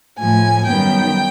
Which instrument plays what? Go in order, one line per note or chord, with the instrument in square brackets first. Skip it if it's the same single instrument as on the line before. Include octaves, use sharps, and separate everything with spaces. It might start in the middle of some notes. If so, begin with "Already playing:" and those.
[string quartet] A2 F3 A3 G#5
F#2 D#3 G3 B3 G5